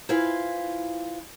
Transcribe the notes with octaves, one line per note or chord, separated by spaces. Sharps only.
E4 F4 B4 C5 F5 G#5